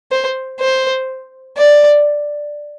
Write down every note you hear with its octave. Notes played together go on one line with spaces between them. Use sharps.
C5
C5
D5